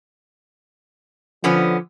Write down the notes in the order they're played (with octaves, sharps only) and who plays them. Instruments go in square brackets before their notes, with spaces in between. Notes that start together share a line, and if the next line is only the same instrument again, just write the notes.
[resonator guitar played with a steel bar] D3 B3 C#4 [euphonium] F3